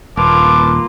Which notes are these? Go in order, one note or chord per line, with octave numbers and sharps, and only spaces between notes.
D#1 A#3 F4 B4 A5 D6